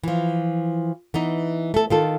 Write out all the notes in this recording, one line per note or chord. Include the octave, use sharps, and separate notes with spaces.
E3 F3
E3 B3 D#4
A3 A4
D#3 F4 A4